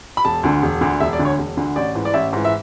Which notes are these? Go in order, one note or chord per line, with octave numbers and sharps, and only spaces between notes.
B5
E1 A5
D2 D3
E1
D2 D3
E1 E5
D5
D2 D3
C#5
E1
D2 D3
A1 D5
G#2 E3
D5
A1 E5
G#2 E3
E5